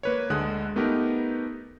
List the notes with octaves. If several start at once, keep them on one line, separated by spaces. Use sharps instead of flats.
A#3 B4 C#5
D2 D3 G#3 D#6 F#6
A3 B3 D#4 G4 A#4 B4